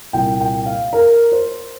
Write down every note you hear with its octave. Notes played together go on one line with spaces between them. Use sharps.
C2 A#2 A#3 G5
G5
F5
A#4
C5